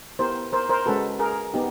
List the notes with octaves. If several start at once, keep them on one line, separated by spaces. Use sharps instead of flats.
B3 E4 G4 A#4 C5
A#4 C5
A#4 C5
G#3 C#4 F#4 A4 B4
G#4 A#4
B3 D#4 G4